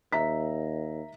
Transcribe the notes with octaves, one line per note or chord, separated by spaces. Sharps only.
D#2 E5 A#5 B6